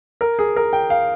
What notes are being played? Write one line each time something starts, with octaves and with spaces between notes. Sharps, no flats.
A#4
G#4
A#4
G5
F5